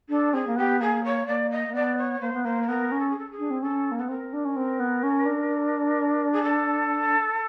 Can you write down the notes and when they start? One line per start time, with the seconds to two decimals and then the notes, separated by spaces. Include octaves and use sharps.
0.09 D4 A4
0.33 C4 G#4
0.47 A#3
0.56 B3 G4
0.80 A#3 G#4
1.04 C#5
1.27 A#3 D5
1.51 D#5
1.68 A#3
1.74 B3 D5
1.97 C#5
2.21 A#3 C5
2.33 B3
2.44 A#3 C5
2.62 B4
2.67 B3 A#4
2.92 C#4
2.99 A4
3.10 G#4
3.18 A4
3.31 G#4
3.39 D4
3.50 C4
3.62 C#4 A4
3.91 A#3
3.98 B3 A4
4.08 C4 A#4
4.33 D4
4.45 C#4
4.56 C4
4.79 B3
5.03 C#4
5.25 D4
6.32 G#4
6.43 A4